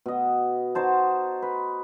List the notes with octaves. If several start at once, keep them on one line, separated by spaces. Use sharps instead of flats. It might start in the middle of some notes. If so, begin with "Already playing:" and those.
B2 D#5
D#4 F#4 C5 A5
B4